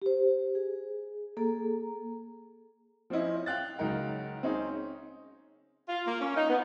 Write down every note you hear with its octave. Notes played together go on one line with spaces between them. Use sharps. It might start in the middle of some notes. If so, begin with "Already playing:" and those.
G4 C5
G#4
A#3 G#4 A4 A#5
F3 C4 C#4 E4 D#5
F5 G5 F#6 A6
C#2 F#3 D#4 A#4 G5
C4 C#4 D#4 G#4
F4
A#3
C#4
D#4
B3